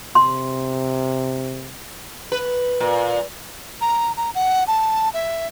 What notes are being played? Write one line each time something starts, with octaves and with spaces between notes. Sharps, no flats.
C3 C6
B4
A#2
A#5
A#5
F#5
A5
E5